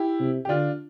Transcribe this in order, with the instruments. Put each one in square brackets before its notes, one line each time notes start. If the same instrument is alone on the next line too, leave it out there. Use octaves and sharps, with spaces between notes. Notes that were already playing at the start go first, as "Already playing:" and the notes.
Already playing: [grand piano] E4 G4
[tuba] C3
[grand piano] G4
[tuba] D3 [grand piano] D4 F4